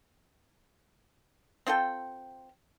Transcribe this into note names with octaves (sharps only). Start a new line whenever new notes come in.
C4 F4 A4 G5